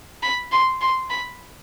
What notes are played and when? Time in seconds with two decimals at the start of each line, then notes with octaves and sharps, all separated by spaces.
0.23 B5
0.52 C6
0.81 C6
1.10 B5